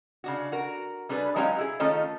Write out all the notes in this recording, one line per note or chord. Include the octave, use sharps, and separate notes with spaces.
C#3 D4 F#4
F#4 A#4
G3 D4 G#4 A#4 B4
F#3 G#3 C#4 D#4 G4 F5
E4 G#4
D#3 A3 C#4 F4 A4 D#5